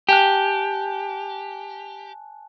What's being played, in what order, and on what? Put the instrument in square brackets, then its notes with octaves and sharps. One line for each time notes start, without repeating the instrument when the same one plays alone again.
[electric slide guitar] G4 [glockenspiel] G#5 A5 F#6